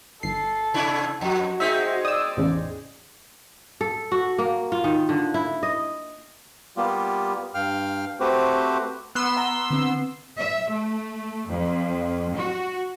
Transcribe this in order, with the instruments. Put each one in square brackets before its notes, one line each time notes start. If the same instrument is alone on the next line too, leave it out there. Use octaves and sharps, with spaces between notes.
[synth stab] G1 C7 [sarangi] A4
[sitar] C3 D4 E4
[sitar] F2 [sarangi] F#4
[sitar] G#3 C4 D#4 [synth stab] E5 B6
[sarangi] D5 [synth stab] D#6 E6
[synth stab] A1 E2 C#3
[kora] A4
F#4
A#3
F4
D#3
D3
E4
D#5
[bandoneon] G3 A#3 B3 F4 G4
G2 F5 G5 F6
A3 C4 F#4 G4 B4 C5
[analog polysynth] B3 C6 E6
[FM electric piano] F#5 A#5
D3 C4
[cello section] E5
A3
F2
F#4